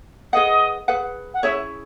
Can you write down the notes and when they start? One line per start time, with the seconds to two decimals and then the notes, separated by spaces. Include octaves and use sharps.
0.32 G#4 B4 D#5 F#5
0.88 G#4 B4 F#5
1.34 F#5
1.43 C#4 E4 G#4 C#5 E5